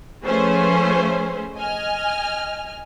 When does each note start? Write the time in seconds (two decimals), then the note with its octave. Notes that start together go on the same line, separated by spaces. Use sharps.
0.24 F3 A3 C#4 G#4 B4 C5
1.56 D#5 G#5 F6